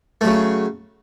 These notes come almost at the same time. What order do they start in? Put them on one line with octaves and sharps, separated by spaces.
A3 F#3 C#3